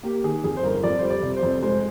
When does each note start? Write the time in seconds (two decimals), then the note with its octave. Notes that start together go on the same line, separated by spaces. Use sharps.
0.03 A#3 G4
0.24 D#3 G#4
0.44 F2 G#4
0.57 C5
0.63 G1 A#4
0.83 F2 D5
0.99 G3 C5
1.10 D5
1.23 C3
1.36 C5
1.43 F2
1.62 G#3 C5